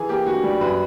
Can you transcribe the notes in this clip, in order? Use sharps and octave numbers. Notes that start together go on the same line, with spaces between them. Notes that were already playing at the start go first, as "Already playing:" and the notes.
Already playing: E3 G#4
A#3 G4
G2 F#4
G3
F#2 B4